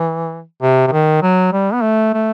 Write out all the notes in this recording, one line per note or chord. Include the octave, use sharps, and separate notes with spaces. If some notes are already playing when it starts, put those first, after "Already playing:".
Already playing: E3
C3
C3
D#3
F#3
G3
B3
A3
A3